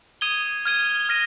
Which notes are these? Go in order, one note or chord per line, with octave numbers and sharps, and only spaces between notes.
D#6 G#6 D#7 G7
F6 G#6 D#7
F6 A#6 D#7